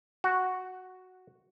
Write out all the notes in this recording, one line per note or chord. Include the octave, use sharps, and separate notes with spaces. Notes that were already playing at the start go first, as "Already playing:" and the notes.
F#4